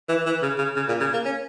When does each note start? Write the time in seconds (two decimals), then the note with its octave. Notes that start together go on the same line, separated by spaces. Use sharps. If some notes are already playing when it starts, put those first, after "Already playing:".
0.09 E3
0.26 E3
0.42 C#3
0.58 C#3
0.76 C#3
0.88 A#2
1.00 C#3
1.13 A#3
1.25 C#4